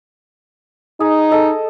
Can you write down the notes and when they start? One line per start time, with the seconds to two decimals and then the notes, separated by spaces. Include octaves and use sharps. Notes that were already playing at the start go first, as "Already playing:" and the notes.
1.00 D#4 G#4
1.32 A4 D#5